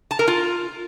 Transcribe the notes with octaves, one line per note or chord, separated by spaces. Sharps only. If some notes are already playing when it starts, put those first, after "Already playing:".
A5
A#4
F4